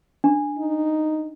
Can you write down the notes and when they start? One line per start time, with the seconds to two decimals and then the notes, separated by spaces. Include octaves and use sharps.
0.24 D4
0.58 D#4